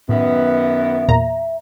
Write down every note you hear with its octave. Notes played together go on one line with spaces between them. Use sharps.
F#2 A2 D#3 B3 E5
E2 A#2 A#5